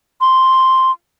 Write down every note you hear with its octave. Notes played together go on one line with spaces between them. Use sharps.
C6